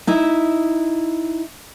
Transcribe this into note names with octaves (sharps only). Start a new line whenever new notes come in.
D#4 E4 E5